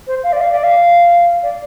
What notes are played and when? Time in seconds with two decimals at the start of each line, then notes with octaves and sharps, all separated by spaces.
0.07 C5
0.23 F5
0.33 D5
0.41 F5
0.52 D5
0.64 F5
1.43 D5